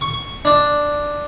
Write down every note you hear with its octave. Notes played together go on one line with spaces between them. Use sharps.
C#6
D4